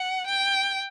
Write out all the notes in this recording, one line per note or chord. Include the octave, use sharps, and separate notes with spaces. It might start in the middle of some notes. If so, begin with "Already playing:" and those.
Already playing: F#5
G5